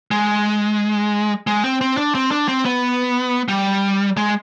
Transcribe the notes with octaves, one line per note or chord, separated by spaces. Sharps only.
G#3
G#3
C4
C4
D4
C4
D4
C4
B3
G3
G#3